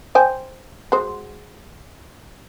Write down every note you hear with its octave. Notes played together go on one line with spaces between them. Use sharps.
C5 G5 G#5
G#3 F#4 C5